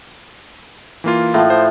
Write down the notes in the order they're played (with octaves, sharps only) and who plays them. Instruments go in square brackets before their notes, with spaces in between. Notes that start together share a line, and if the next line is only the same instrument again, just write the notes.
[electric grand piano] E3 A#3 F4
[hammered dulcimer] A2 F3
[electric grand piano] C5